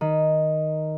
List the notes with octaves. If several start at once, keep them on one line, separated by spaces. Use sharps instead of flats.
D#3